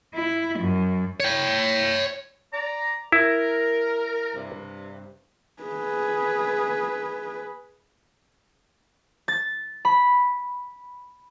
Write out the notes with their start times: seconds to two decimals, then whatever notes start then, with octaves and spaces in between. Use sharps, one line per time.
0.13 E4
0.58 F#2
1.20 C#5 G5
2.53 D5 A#5
3.12 E4 A#4
4.34 G2 C3
5.63 G#4 B4
9.28 A6
9.85 B5